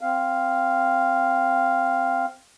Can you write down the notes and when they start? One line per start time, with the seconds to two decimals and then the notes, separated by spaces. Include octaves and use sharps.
0.01 C4 F5